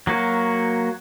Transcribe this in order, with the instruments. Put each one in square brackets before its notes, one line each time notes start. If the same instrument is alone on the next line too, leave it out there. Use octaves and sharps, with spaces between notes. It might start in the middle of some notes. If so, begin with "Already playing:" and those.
[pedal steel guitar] F#3 A#3 F#4